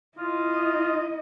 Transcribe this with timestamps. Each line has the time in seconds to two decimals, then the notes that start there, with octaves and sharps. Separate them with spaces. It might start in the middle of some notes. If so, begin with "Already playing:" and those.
0.18 E4 F4 D#5